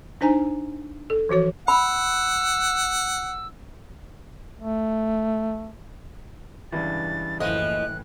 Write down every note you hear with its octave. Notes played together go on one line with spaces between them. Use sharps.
D4 D#4 C5 G#5 A#5
A4
E3 F3 F#4 C#5
F#5 B5 E6
A3
C#2 G2 E3 A6
F#1 A2 E3 F3 D#5 F#6